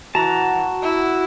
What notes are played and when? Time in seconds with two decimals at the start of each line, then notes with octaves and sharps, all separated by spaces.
0.15 E3 F#4 A5 A#5
0.82 E4